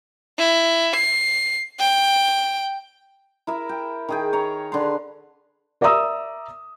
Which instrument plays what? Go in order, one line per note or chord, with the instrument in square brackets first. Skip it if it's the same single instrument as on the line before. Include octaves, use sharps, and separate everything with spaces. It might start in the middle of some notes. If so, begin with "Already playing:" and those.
[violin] E4
C7
G5
[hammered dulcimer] E4 A#4 E5
G5
D#3 G#4 G5
C#5 G#5 A#5
D3 B4 C6
[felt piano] A#4 D5 E5 A#5 D#6 E6